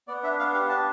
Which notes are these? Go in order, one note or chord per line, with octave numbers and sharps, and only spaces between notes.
B3 D5
D4 E5
B3 F5
G4 F5
D4 A5